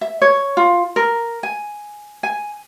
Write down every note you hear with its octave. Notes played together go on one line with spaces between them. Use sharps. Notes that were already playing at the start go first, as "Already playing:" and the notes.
E5
C#5
F4
A#4
G#5
G#5